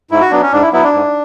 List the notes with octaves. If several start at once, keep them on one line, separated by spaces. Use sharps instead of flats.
G#2 E4
F#4
F#3 B3 D4
C#4
G#2 D4
E4
F#3 B3 E4
D4
G#2